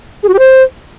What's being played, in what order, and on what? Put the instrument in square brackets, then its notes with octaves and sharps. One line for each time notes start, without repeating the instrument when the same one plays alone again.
[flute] G#4
F#4
G4
C5